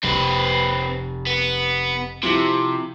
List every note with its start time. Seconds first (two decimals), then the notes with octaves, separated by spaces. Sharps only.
0.03 F1 C4 B4
1.26 B3
2.23 C3 F3 E4 F#7